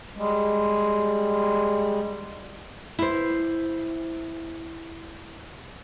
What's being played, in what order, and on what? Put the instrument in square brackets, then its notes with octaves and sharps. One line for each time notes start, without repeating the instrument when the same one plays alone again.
[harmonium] G3 G#3
[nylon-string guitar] E4 C5